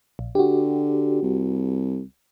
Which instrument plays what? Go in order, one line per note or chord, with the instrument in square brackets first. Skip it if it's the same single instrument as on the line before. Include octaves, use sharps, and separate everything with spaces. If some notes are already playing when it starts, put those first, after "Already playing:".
[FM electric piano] A#1
[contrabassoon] D3 [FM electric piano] F#4 G4
[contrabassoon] C2